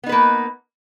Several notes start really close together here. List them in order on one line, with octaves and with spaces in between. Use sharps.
B3 D#4 B4 A#3